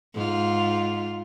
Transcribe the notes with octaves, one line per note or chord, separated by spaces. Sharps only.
G#2 F4